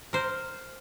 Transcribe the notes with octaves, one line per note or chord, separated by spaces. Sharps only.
A#4 C5